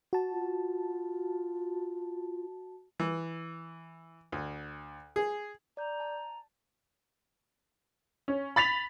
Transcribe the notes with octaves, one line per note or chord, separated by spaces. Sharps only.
F#4 A5
F4
E3
D2
G#4
D5 A#5 G6
A5
C#4
B5 A6 B6 F7